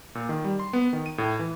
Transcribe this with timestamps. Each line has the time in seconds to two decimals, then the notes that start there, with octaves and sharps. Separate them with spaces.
0.15 A#2
0.29 D#3
0.44 G3
0.60 C6
0.73 B3
0.93 D#3
1.06 D#7
1.18 A2
1.39 E3